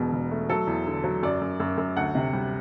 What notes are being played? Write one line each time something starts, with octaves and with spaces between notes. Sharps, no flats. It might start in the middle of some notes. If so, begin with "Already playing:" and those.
Already playing: E1 B2
E1
A3
F#3 A4
E2
D3
F#3
F#2 D5
F#2
F#2
F#2
D2 F#5
C3
G3